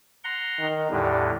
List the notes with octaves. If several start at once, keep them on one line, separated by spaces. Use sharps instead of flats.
F#5 A#5 C6
D#3
E2 A2 D3 G3